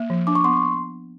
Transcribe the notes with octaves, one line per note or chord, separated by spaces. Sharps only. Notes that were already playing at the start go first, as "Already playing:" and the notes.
Already playing: A#3
F3
D4 D6
C#6
B3 C6